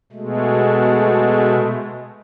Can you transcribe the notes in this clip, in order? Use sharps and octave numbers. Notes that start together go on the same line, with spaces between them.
B2 G#3 A3